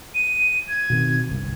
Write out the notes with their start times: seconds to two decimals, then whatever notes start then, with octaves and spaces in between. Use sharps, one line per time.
0.15 D#7
0.68 G#6
0.90 B2 D#3 C4
1.29 G1 C2